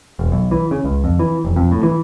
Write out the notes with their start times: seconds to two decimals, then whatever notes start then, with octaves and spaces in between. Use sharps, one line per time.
0.19 E1
0.32 B1
0.51 E3
0.71 C#3
0.84 C#2
1.04 F2
1.19 E3
1.45 F1
1.56 F2
1.72 A2
1.83 E3